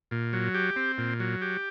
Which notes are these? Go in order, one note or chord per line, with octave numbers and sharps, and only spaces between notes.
A#2
F#3
G4
C4
A#2
F#3
G4